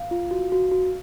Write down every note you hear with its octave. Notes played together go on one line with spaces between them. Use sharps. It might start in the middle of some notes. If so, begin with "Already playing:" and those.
Already playing: F5
F4
F#4
F#4
F#4